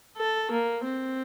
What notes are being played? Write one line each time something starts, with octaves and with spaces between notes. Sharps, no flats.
A4
A#3
C4